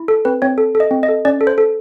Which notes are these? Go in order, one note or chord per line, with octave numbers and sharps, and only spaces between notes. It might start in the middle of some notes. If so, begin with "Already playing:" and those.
Already playing: E4
A4
C4 B4
C4 C#5
A4
A4
D#5
C4
D#5
A4
C#4 D5
A4
C5
A4